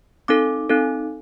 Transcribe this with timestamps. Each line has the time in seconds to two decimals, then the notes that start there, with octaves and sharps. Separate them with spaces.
0.28 C4 D#4 A4 D6
0.69 C4 D#4 A4